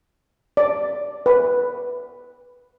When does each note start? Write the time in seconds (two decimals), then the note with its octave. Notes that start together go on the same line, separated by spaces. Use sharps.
0.57 D5
1.26 B4